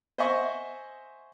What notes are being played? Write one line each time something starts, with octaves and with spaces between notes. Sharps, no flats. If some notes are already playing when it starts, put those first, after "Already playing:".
C5 D#5 E5 F#5 G#5 C#6